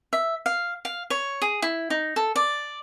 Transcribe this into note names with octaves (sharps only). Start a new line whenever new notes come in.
E5
F5
F5
C#5
G#4
E4
D#4
A4
D5